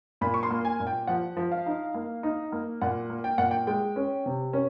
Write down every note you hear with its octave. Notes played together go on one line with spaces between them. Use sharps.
A#2 B5
C#6
C6
A#3
G#5
A#2
G5
F3 F#5
F3
F5
D#4
A#3
D#4
A#3
A#2 F#5
A#3
G5
A#2 F#5
G5
G#3 G5
C#4
C3
C#4